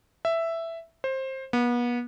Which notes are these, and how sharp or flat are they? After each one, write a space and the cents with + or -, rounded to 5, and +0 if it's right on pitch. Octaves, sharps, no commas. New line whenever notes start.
E5 +5
C5 +20
B3 -35